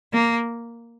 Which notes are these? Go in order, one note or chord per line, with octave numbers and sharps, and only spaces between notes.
A#3